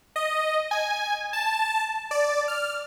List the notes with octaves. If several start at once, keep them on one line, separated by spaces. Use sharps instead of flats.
D#5
G#5
A5
D5
F6